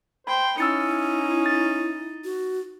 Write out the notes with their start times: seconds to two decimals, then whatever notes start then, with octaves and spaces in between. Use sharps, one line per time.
0.27 C5 G5 B5
0.58 C#4 D#4 E4 E6 A6 C#7
1.46 A6
2.24 F#4